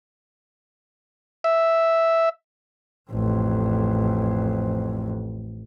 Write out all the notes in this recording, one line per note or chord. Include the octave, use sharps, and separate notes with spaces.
E5
A1 F2